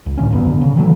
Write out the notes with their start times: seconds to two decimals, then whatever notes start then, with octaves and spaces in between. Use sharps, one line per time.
0.06 C#2
0.18 A2 D3 A3 C#4
0.30 G1 F#2 B3
0.47 D3
0.61 C#3
0.76 D#3 E3 F#3 A3